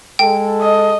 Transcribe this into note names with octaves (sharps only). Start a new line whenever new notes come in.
G#3 A4 G5
D#5